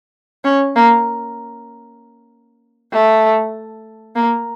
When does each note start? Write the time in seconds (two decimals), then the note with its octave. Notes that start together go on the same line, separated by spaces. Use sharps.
0.44 C#4
0.76 A#3
2.92 A3
4.16 A#3